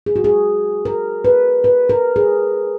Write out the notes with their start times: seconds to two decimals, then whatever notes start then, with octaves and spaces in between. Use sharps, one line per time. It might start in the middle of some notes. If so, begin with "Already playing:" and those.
0.06 G#4
0.16 F#4
0.24 G#4
0.85 A#4
1.25 B4
1.64 B4
1.89 A#4
2.16 G#4